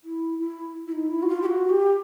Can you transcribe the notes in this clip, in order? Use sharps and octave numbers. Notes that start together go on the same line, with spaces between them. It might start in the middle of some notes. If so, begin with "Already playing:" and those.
E4
E4
E4
D#4
E4
F#4
F4
G4
F#4
G4